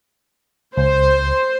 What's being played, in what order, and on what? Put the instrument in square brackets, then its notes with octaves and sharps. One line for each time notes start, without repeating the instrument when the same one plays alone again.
[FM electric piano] C#2 [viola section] C5